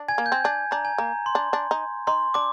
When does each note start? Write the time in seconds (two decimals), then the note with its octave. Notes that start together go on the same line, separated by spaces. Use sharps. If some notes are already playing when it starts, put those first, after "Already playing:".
Already playing: D4
0.08 G#5 G#6
0.18 A#3
0.26 G6
0.32 C4
0.44 D4 G#5
0.71 D4 A#5
0.85 G#5
0.98 A#3 A#5
1.26 C6
1.35 D4
1.53 D4
1.71 D#4
2.07 D#4 C6
2.34 D4 D6